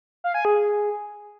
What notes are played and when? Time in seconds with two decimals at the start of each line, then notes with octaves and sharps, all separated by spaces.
0.24 F5
0.34 G#5
0.45 G#4